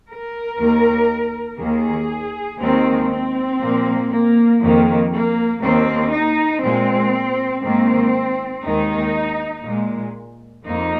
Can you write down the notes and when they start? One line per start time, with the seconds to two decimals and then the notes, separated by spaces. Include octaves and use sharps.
0.08 A#4
0.58 D#2 D#3 A#3
1.59 D#2 D#3 A#3 G#4
2.60 D#2 D#3 G#3 C4
3.11 C4
3.61 A#2 F3 A#3
4.10 A#3
4.61 F2 D#3 A#3
5.12 A#3
5.62 D#2 D#3 A#3 C4
6.12 D#4
6.63 A#2 G#3 C4
7.63 G#2 D#3 A#3 C4
8.64 D#2 D#3 G#3 D#4
9.64 A#2 G#3
10.65 F2 F3 A#3 D#4